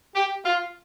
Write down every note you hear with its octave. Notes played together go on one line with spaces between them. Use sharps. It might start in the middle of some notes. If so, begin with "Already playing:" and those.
G4
F4